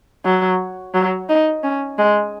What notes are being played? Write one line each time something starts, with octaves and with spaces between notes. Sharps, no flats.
F#3
F#3
D#4
C#4
G#3